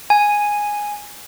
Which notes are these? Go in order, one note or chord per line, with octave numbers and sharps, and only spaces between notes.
G#5